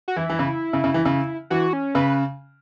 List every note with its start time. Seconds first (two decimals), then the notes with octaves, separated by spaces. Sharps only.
0.08 F#4
0.16 E3 E4
0.30 E3
0.39 C#3
0.73 C#3
0.84 C#3
0.94 E3
1.05 C#3
1.50 E3 F#4
1.73 C#4
1.95 C#3 B4